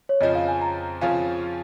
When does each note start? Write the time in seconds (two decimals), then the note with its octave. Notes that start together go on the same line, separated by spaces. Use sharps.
0.09 C#5
0.21 F2 C#3 F3 D#5
0.35 F5
0.48 G#5
0.62 A#5
1.01 F2 C#3 F3 C#4 F4 F5